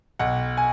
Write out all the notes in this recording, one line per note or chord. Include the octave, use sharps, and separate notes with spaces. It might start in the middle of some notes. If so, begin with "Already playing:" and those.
B1 F#5
G#5